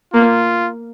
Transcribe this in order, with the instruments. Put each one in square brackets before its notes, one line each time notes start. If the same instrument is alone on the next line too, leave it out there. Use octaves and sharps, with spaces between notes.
[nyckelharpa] A#3 [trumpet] F4